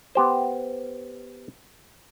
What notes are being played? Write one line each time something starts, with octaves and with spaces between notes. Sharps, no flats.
B3 G4 C5